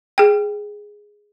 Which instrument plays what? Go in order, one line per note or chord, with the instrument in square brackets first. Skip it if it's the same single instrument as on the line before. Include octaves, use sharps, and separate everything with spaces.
[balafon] G#4 G5